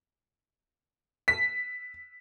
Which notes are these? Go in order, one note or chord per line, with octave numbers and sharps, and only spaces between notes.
B6